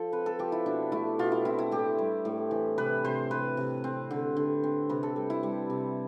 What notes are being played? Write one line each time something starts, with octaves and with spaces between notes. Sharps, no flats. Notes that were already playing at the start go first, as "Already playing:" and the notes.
Already playing: F3 A4
C4 B4
A4
F3 G4
E4
B2 D4
A3 E4
B2 F4
E4
C4 E4
E4
A2 G4
G3
A2
E3
C3 B4
C3 C5
C3 B4
C3
C4
D3
D3
C4
C3 B4
A4
G3
E4
G3
C3